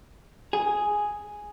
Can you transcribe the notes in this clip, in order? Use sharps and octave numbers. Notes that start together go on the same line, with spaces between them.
G#4